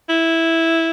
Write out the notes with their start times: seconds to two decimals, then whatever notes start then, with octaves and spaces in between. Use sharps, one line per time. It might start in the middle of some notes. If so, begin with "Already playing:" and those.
0.09 E4